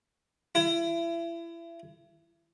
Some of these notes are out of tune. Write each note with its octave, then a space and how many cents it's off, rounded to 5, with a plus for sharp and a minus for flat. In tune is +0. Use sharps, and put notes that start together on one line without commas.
E4 +30